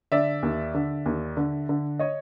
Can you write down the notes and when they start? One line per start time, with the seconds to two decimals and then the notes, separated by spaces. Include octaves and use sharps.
0.12 D3 D5 E5
0.43 D#2
0.75 D3
1.06 D#2
1.37 D3
1.69 D3
1.99 C#5 D#5